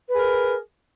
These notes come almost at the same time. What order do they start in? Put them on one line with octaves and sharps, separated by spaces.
B4 G#4 A#4